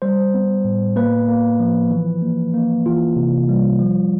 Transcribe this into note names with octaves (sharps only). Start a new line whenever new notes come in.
G3 C5
B3
A2
A#3 B4
A#3
F3
E3
A#3
A#3
E3 F4
C3
G3
F3